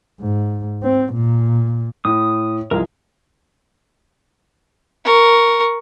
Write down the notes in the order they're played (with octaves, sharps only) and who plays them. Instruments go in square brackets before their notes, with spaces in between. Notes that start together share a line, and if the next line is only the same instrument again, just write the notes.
[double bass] G#2
C4
A#2
[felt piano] A2 [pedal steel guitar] D#6
[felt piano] C2 F3 [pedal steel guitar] G#3 A#4
[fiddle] A#4 C#6